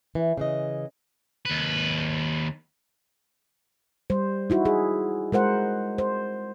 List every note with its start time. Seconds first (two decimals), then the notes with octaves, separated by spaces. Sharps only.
0.15 E3
0.38 C#3 E3 D#5
1.45 D#2 B4
4.10 G3 C5
4.50 D#4 E4 F#4
4.65 G#4
5.32 G#3 A#4 C5 F#5
5.98 C5